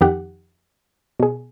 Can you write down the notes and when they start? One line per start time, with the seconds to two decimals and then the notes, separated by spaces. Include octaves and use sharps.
0.01 F2 D#3 G4 F#5
1.20 B2 G#4